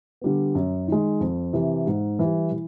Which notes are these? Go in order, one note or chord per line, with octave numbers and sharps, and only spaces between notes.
D3 G3 B3
F#2
D#3 G#3
F2
C3 E3
G#2
E3 G3
E3